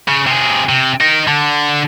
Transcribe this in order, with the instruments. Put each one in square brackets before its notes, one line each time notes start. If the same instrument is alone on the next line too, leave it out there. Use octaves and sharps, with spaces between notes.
[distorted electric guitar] C#3
C3 G#4
C3
D#4 A#4
D3